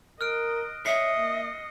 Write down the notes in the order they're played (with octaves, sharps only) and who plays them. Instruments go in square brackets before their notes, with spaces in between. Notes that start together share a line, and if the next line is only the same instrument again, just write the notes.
[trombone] A#4 [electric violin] D#5 [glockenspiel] F6 F#6 D7
[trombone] C#5 [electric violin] D#5 [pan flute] E5 [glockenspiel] C7 C#7
[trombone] A#3